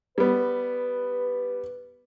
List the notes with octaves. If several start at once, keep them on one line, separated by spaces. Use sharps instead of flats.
G3 B3 B4